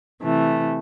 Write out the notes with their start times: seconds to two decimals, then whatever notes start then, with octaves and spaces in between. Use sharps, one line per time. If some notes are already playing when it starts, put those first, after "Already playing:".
0.21 C3 E3 A3